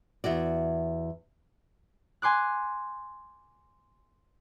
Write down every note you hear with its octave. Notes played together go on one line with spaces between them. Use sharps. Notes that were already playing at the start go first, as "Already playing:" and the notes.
E2 E4 F#4 D5
G#5 C6 D6 F#6